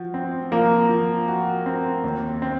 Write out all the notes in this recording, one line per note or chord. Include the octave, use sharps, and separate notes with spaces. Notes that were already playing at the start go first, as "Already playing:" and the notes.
Already playing: F3 F#4
C4
F3 A#3
F3
F#4
C4
D#2
C4